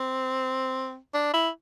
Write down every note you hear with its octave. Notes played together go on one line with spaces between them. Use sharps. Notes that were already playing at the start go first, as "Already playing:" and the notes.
Already playing: C4
D4
E4